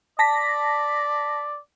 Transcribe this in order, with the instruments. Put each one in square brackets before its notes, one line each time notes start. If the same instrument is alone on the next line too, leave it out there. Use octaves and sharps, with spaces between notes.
[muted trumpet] D5 [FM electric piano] A5 A#6 B6